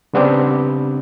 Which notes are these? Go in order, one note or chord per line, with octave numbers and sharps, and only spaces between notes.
C#3 G3 B3 C4 D4 G4